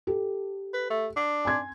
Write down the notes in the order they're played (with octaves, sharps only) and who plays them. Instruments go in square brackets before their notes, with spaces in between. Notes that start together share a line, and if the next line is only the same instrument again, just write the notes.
[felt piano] G4 A4
[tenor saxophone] B4
A3
D4
[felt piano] G#5 C6 G#6